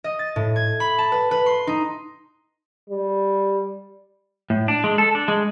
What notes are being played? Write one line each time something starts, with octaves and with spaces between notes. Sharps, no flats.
D#5
A6
A2
G#6
B5
A5
B4
B4
C6
D#4
G3
A2
D4
G#3
A4
D4
G#3